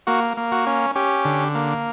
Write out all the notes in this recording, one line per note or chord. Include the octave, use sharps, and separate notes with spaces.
A#3 F#4
A#3
F#4
C#4
C#4 G4
D3
A#3